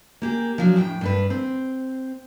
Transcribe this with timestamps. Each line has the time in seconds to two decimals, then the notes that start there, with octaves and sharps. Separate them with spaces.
0.22 A#3 G4 G#4
0.58 F3 F#3 D4
0.76 F2 A2 G5
1.01 G2 D4 B4
1.30 C4